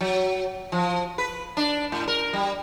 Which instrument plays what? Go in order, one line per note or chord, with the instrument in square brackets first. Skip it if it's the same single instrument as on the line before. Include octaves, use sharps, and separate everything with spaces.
[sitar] F#3
F3
B4
D4
A2
A#4
G3